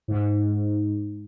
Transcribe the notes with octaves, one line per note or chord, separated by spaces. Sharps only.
G#2